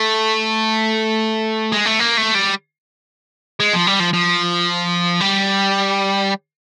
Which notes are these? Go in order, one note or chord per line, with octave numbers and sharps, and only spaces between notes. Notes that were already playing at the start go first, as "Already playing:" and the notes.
Already playing: A3
G#3
A3
A#3
A3
G3
G#3
F3
G3
F3
F3
G3